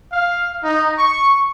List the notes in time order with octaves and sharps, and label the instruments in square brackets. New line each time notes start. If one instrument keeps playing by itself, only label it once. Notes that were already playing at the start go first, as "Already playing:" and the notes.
[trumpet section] F5
D#4
C#6